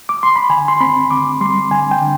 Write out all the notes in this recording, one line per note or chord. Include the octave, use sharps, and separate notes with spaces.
D6
C6
B5
D3 G#5
C6
C4 B5
D3 D6
G3 C6
D3 G#5
G5
D3